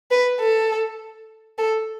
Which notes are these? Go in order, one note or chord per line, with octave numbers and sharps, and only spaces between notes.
B4
A4
A4